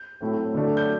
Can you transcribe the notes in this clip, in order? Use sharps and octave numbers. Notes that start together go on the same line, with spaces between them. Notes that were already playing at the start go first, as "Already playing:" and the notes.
Already playing: G6
A2 F#3 A3 C4 E4
D3 F#3 A3 D4
G6